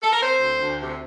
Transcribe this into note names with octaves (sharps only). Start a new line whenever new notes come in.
A4
A#4
C4 C5
D2
D2
C3